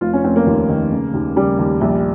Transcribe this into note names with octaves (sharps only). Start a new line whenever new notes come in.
F1 F4
C#4
F1 C4
A#3
D#2
D#3
C#3
D#2
C#3 G3
D#2
A#1 G3